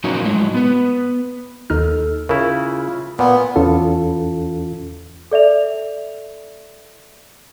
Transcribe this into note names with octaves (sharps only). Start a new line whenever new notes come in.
F3 F#3 A#3 C#4 D#4 F#4
A2 F#3 G#3
B3 B4
D#2 D#4 A4 F6
C#3 E4 F4 A#4
A#2 B3
E2 E3 C#4 F4 A4
A4 D5 E5 F7